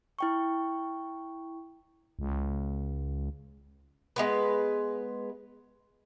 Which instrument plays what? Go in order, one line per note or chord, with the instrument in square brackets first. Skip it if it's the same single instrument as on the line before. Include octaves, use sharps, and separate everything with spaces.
[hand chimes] E4 G5 C#6
[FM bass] C#2
[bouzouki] G#3 B3 B4